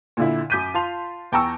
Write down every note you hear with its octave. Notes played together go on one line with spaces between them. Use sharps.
A#2 D3 E4
F#2 D6 G6 B6 D#7
F4 A5 C6 F7
E2 G5 A5 A#5 C#6 E6